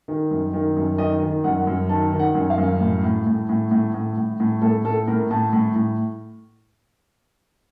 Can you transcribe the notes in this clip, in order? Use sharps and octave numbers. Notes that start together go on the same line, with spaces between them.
D#3
F#2
D#3
F#2
D#3 D#5
D#3
F#2 F#5
F#2
D#3 A5
D#3
F#5
F#2
F5
F#2
A2
A2
A2
A2
A2
A2
A2
A2
A2 A4
A2 A4
A2 A#4
A2 A5
A2
A2